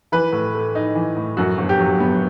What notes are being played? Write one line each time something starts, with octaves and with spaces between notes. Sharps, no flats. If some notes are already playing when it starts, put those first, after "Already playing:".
E3 B4
A2
A3
D#4
E3
A2
F#2 F#4
G1
G4
F#3
B3